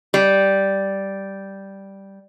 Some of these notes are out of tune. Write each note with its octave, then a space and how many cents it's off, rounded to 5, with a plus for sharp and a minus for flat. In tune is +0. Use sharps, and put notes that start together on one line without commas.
G3 -5